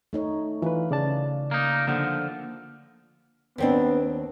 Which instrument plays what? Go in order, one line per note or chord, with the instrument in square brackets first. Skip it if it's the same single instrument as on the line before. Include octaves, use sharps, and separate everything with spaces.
[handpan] A3 D#4 C#5
[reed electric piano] E3 B4 [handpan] F4
[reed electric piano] C#3 D5 A5
[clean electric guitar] A#3 D#4
[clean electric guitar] D3 F3 [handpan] A#3 F#5
[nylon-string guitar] D#2 C4 D4 [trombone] B3